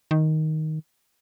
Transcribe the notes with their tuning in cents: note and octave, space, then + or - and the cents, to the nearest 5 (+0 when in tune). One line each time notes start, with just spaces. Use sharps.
D#3 +5